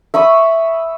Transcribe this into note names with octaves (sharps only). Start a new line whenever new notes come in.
E5 B5 C#6 D#6